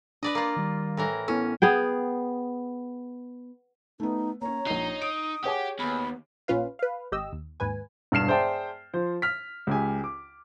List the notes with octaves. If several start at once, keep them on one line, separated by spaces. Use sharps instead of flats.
D4 B4 D5 D#5
A#3 F4
D#3 G3
A2 E3 A#4
B3 C#4 E4 A4
B3 G#4 G5
A3 B3 D#4
A#3 C#4 C#5 A#5
A#1 D#4 C7
D#6 D7
G4 G#4 C#5 F#5 G#5
D#2 B3 B5
A#1 A#2 C#4 F4 B4 F5
B4 F5
G#1 G4 D#5 E6
D#2
D#2 G#2 B4 G#5
E1 G2 F6 C7 E7
G#4 C5 D5 E5 G5 A5
F3 C5
F6 B6
C#2 G4 G#5
D6